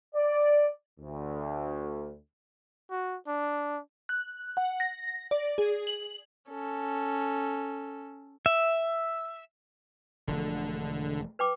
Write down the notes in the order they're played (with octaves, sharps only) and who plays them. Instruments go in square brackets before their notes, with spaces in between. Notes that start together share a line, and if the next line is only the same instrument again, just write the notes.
[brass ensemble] D5
D2
[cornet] F#4
D4
[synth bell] F#6
F#5
A#6
D5
G#4
F#7
[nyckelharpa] C#4 A4
[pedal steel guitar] E5
[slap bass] E1 F3 A3 [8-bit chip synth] D3
[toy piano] B4 G5 D6